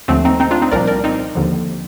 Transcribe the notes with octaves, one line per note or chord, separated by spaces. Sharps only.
D#2 D3 F3 A3 C4
C4 D#4
C4 D#4
D4 F4
C4 D#4
C2 A#2 F3 A#4 D5
A#4 D5
C4 D#4
D#2 D3 F3